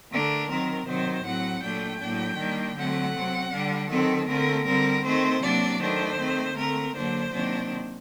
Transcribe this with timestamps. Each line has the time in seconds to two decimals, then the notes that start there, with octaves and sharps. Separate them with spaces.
0.12 D3 A3 D4 A#4
0.50 D#3 F#3 C4 A#4
0.88 C3 D#3 F#3 C5
1.25 A2 F#3 C4 F#5
1.64 A#2 F#3 A3 D4 G5
2.01 A2 F#3 A#3 D4
2.40 D#3 G3 A#3 D4
2.78 D3 F#3 A3 C4 F#5
3.16 C3 F#3 C4
3.53 D3 G3 D4
3.92 D#3 F#3 C4 A4
4.29 D3 A3 C4 A#4
4.67 D3 G3 C4 A#4
5.05 D#3 A3 C4 C5
5.43 C3 F#3 A#3 D4 D5
5.82 D#3 A3 D4 C5
6.19 D#3 A3 C4
6.57 D3 A3 C4 A#4
6.95 D3 F#3 A#3 D4 C5
7.33 C3 D#3 F#3 A#3 D4